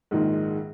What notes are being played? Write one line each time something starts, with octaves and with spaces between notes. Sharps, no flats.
A#1 G#2 D#3 G#3